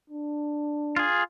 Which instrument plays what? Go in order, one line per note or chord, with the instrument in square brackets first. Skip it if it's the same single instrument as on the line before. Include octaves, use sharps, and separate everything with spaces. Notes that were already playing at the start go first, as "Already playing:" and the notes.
[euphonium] D4
[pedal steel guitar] F4 G#4